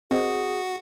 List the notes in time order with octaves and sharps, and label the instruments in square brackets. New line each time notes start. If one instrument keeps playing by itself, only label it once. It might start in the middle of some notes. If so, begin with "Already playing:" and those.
[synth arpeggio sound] C4 [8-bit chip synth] F#4 [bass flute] G#4 [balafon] A#4 C5 D#5